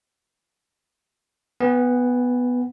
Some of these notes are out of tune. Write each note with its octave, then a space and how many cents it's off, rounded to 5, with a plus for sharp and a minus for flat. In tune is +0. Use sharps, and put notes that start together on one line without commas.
B3 +0 G#5 -40